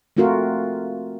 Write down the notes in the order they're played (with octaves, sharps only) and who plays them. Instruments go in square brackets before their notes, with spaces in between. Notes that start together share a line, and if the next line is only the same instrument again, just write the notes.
[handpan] A3 C4 F4 F#4 A#4